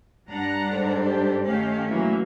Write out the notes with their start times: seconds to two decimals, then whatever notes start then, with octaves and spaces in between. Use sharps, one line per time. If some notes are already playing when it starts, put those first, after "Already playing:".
0.29 G2 G3 D4 F#5 A#5
0.71 G#2 A4 C5
1.02 G4
1.45 D#3 A3 C#4 G4 F5
1.88 E3 F#3 A#3 E5